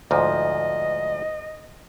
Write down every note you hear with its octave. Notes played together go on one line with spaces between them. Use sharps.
D2 G#2 F3 D#5